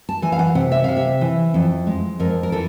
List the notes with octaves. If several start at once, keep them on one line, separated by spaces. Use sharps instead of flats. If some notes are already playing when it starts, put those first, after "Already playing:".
A5
E3 G#5
F5
F#5
C3 F#5
E5
C3 F5
E5
E3
F2
G#3
F2 A#4
A#4
E3 A4